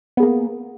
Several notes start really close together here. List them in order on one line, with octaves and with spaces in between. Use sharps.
B3 G#4 A#3